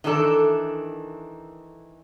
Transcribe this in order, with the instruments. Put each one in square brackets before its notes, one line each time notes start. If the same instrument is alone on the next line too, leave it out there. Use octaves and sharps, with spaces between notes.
[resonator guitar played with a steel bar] D#3 E3 D4 A4